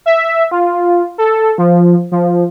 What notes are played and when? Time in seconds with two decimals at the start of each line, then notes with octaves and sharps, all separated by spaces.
0.06 E5
0.51 F4
1.18 A4
1.58 F3
2.12 F3